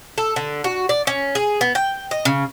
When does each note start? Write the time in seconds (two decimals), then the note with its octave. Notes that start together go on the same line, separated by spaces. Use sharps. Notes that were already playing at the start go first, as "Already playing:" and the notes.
0.18 A4
0.36 D3
0.64 F#4
0.89 D5
1.07 C#4
1.35 G#4
1.61 B3
1.75 G5
2.11 D#5
2.25 C#3